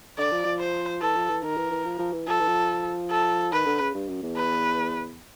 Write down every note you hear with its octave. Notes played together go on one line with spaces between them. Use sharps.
D3 D5
F3
F3
C5
E3 A4
F3
E3
D#3 A#4
E3
E3
F3
F3
E3
F3 A4
E3
F3
A4
D#3 B4
D3
C#3
G2
F#2
E2
B4